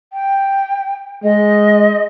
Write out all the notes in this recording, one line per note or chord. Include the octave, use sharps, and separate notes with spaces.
G5
G#3 D#5